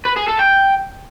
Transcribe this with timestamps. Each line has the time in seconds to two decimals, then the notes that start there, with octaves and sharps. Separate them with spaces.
0.05 B4
0.16 G#4
0.28 A4
0.39 G5